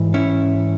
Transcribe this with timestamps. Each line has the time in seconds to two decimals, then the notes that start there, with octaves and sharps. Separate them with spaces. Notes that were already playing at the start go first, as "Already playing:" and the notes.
Already playing: G#2 E3
0.14 C#4 E4